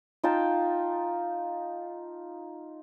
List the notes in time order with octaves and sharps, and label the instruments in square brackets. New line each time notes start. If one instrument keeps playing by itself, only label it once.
[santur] D#4 F4 G5 A5